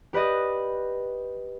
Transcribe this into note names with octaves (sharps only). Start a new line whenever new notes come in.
G4 B4 D5 D#5